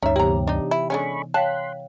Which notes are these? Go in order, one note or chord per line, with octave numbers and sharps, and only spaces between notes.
D2 G2 C#4 D#4 C#5 E5 A#5
C3 E3 A#3 B3 G4 A#5
D4 D#4
E4
D3 G#3 C#4 B5 C#6
C#5 F5 G5 A5 C6 F#6 B6